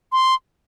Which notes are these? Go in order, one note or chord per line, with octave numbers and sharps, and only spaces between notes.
C6